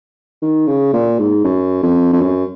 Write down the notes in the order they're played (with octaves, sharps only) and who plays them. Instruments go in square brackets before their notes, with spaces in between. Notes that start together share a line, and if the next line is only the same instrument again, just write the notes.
[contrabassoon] D#3
C#3
A#2
G#2
F#2
F2
F2
F#2